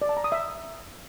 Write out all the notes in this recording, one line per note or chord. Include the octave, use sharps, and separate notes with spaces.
D5
A5
A#5
D#6
E5